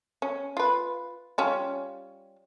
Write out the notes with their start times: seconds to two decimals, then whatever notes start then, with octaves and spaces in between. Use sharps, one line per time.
0.22 C#4
0.57 F4 B4
1.38 G3 C#4 F4